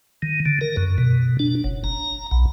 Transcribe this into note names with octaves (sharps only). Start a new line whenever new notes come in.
D#3
D3
A#4
F#2
B2
D4
F#1
A#5
B1